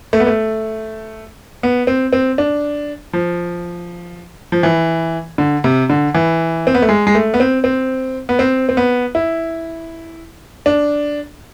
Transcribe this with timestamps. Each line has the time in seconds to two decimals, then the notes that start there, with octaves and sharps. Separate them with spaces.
0.13 A3
0.20 B3
0.27 A3
1.63 B3
1.87 C4
2.13 C4
2.38 D4
3.13 F3
4.52 F3
4.63 E3
5.38 D3
5.64 C3
5.90 D3
6.14 E3
6.67 C4
6.75 B3
6.82 A3
6.89 G#3
7.07 G#3
7.15 A3
7.34 B3
7.40 C4
7.64 C4
8.29 B3
8.39 C4
8.69 C4
8.77 B3
9.15 E4
10.66 D4